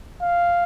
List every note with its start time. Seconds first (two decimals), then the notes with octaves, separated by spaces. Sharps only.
0.22 F5